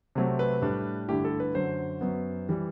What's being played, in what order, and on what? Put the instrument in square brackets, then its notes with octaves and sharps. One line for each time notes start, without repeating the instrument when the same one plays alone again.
[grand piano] C3 F#3 A3 C4
B4
A2 G3 D4
G2 D3 A3 E4 G4
A4
B4
F#2 D3 F#3 C5
F#2 F#3 B3
E3 G3